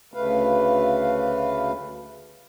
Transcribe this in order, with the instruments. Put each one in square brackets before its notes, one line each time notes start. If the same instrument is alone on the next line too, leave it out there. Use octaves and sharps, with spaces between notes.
[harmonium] D2 C#3 A3 B4 F5